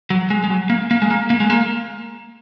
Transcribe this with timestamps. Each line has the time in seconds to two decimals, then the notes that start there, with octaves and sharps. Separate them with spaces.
0.10 F#3
0.30 G#3
0.44 G#3
0.50 F#3
0.70 A#3
0.91 A#3
1.02 G#3
1.11 A#3
1.30 A#3
1.40 G#3
1.50 A#3